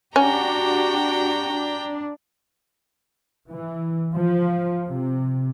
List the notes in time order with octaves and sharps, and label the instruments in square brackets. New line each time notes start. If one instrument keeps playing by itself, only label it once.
[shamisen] C#4 [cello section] D4 F#4 G4 [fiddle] G5 A#5
[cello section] D4
[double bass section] E3
F3
C3